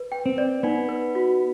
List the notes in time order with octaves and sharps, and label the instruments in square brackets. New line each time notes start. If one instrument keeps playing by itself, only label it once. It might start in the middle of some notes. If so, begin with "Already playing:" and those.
Already playing: [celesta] B4
G5
[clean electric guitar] C4
[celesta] D5
[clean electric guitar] B3 [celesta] D#4
[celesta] B4
F#4